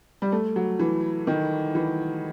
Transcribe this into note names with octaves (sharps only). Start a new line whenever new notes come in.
G3
A3
F#3
E3
D#3
E3